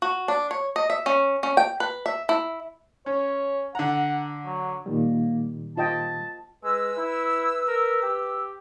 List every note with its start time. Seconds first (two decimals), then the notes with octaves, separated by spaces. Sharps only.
0.02 F#4
0.28 D4
0.51 C#5
0.76 D#5
0.90 E5
1.06 C#4
1.43 C#4
1.57 G5
1.80 B4
2.06 E5
2.29 E4
3.06 C#4 C#5
3.75 D3 F#5 A#5
4.45 F#3
4.86 A#2 D#3 G3 A#3
5.77 F4 D#5 G5 A5
6.64 G#3 B4 E6
6.97 E4
7.68 A#4
8.02 G4